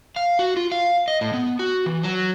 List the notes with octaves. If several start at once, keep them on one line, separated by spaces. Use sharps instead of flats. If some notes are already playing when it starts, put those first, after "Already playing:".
F5
F#4
F4
F5
D#5
A2
B3
F#4
E3
F#3